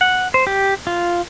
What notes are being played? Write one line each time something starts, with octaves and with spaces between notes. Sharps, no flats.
F#5
C5
G4
F4